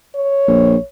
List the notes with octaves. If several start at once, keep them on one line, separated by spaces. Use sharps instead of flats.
C#5
A#1